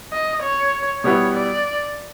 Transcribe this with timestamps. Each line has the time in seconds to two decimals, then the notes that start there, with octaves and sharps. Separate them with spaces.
0.12 D#5
0.43 C#5
1.04 B2 G3 B3 E4 C#5
1.35 D5